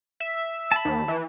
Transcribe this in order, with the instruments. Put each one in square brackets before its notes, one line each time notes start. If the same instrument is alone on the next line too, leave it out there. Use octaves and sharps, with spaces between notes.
[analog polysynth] E5
[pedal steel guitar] A5 B5
[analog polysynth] D#2
E3